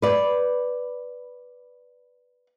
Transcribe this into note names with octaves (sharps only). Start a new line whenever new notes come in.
B4 D5